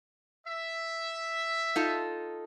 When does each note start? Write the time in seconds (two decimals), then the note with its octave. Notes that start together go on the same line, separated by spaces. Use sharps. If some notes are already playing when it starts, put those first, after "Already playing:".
0.46 E5
1.76 D#4 F4 A4